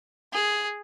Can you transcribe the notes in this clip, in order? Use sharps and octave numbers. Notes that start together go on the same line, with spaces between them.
G#4